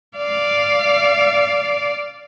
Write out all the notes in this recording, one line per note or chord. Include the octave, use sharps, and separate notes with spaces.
D5 F5